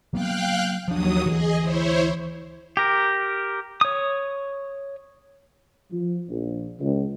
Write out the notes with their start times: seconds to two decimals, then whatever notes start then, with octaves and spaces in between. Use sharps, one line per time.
0.13 F#3 A#3 B3 F5 G5 F#6
0.88 D#2 F3 F#3 D4 D#6
1.26 D2 E3 G#4 D#5
1.61 E4 C5 C#5
2.77 G4 A#4
3.81 C#5 D#6
5.92 F3
6.29 A#1
6.80 C#2